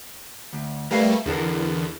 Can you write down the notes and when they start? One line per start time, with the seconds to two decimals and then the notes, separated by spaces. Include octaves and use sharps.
0.53 D2
0.91 G3 A3 A#4 B4 F5
1.26 E2 D3 A4 A#4